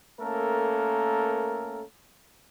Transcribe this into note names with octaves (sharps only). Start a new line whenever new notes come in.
A3 A#3 C#4 A4 A#4